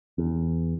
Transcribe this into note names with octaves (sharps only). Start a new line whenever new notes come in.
E2